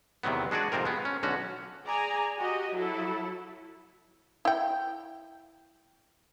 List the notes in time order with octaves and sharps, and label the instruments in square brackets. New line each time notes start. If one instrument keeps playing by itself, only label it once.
[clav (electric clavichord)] E2 C3 D#3 F#3 B3
G#3 D4 F#4 G#4 D5
F2 G#2 C3 C4 A#4
G#3 B3
C#4
B1 D3 C#4 F#4
[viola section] G#4 D5 G#5 A#5
F#4 G4 D#5
F#3 E4 A4
[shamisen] E4 G5